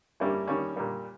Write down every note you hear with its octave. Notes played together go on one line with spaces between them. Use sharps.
G2 G3 A#3 C#4 E4
D#3 G3 A#3 C#4
A#2 G3 A#3